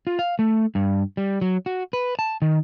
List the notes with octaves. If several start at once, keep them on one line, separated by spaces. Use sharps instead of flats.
F4
F5
A3
G2
G3
F#3
F#4
B4
A5
D#3